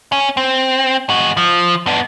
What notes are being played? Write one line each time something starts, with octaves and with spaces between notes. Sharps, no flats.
C#4
C4
G#3 F#4
F3
B3 D4